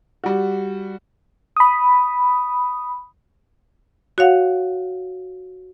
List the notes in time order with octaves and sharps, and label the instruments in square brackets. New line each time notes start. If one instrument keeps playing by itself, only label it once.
[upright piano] G3 F#4
[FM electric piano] B5 D#6
[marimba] F#4 C#5 F5 F#5